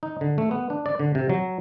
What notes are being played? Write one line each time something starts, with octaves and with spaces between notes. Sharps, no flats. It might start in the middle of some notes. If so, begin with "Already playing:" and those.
D#4
D3
A3
B3
D4
D5
D3
C3
F#3